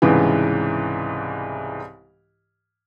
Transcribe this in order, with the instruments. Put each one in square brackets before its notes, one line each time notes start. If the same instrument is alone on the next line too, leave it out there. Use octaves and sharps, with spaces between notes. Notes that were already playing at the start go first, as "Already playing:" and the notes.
[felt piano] C2 G#2 C#3 E3